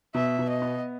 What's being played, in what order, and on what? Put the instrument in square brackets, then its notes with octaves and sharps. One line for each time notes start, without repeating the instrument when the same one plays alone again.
[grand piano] B2 [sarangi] E5
[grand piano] B2
[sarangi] D#5
[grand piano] B3